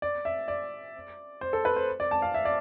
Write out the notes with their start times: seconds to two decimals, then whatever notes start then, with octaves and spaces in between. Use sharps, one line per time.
0.02 D5
0.25 E5
0.48 D5
1.41 C5
1.53 A4
1.65 B4
1.76 C5
2.00 D5
2.11 A5
2.22 F5
2.34 E5
2.45 D5